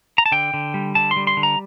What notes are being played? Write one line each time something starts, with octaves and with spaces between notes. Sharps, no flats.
A#5
A5
D3 G5
D3
G3
D3 A5
C6
G3
C6
D3
A#5